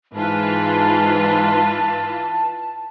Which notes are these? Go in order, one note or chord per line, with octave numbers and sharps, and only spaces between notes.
G#2 E3 F4 B4 A5